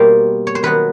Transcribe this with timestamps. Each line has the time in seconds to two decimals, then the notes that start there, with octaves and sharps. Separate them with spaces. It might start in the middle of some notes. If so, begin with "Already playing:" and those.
Already playing: B2 G3 A#3 C5
0.47 C#5
0.55 C5
0.63 D#3 F#3 B3 B4